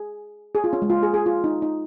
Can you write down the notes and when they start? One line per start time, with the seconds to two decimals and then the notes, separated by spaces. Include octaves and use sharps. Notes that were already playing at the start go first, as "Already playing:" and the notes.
Already playing: G#4
0.55 G#4
0.64 F4
0.73 C#4
0.82 G#3
0.90 F4
1.03 G#4
1.14 G#4
1.26 F4
1.44 D#4
1.62 D#4